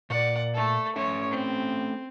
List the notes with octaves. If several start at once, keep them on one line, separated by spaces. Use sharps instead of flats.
A#2 D5 F#5
A3 A4
A3 C#4 C#5 E5
C4